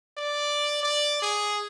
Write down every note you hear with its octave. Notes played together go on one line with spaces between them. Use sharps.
D5
D5
G#4